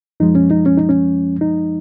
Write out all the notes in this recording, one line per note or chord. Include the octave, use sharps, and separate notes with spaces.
F#2 F3 G#3 D#4
C#4
D#4
C#4
D#4
C#4
D#4